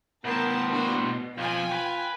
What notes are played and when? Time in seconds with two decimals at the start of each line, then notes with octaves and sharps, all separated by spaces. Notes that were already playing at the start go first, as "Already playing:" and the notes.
0.25 A2 B3 A#4 C5 A5
0.68 A#3 D4 F#4
0.98 B2
1.38 F2 F3 F4 G5 G#5
1.72 B4